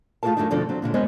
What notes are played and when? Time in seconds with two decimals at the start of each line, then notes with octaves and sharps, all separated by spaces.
0.23 A3 F4 F#4 G#4 A#4 A5
0.37 F#2 C3 D#3 A3 D4 D#4
0.50 F2 B2 D3 F3 D4 A4
0.69 F#3 C4
0.82 A#2 D3 G3 G#3
0.94 F#2 G#3 B3 C#4 C5 D#5